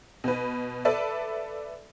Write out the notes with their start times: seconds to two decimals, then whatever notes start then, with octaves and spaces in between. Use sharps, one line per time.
0.24 B2 B4
0.85 A4 B4 D5 E5